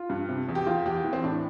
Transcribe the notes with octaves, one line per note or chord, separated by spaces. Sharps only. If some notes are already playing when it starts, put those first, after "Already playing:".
Already playing: F4
G2
C3
E2
G4
E2 F4
E2 G4
E3
C4
A2 D4